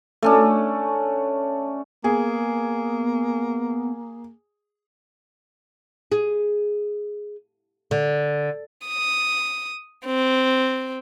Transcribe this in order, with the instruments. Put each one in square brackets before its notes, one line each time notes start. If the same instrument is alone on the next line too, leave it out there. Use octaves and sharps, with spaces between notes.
[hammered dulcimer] A3 C#4 D4
[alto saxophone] A#3 [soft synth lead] B3 [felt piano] G#4
[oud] G#4
D3
[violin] D#6
C4